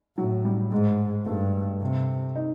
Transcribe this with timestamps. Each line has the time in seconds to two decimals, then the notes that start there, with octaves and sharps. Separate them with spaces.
0.17 A2 F#3
0.45 G3
0.72 G#2 G#3
1.26 G2 A3
1.81 C3
2.35 D#4